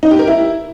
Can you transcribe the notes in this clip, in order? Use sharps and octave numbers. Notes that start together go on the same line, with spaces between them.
D#4
G4
A#4
E4